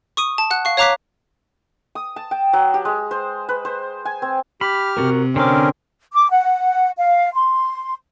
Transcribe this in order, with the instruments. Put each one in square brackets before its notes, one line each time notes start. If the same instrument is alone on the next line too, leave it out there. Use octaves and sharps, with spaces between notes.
[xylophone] C#6 D#6 D#7
A5
F#5 F#6
F5 C#6
C#5 F5 A#5 D6 F#6 B6
[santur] D#6
A5
G5
F#3
G4
G#3
C5
B4
C5
G#5
C4
[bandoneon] G4 F6 [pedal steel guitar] B5
[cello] C3 [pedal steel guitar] F#4 A#4
[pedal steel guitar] D3 D6 [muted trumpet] C4 [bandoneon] C#4 A#4
[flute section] D6
F#5
F5
C6